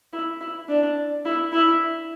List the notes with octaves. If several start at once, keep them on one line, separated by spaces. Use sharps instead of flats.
E4
E4
D4
E4
E4